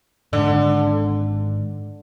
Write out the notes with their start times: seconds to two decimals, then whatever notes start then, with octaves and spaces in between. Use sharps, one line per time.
0.32 G#2 D3 D#3 G#3